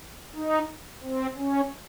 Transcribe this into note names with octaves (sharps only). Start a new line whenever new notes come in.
D#4
C4
C#4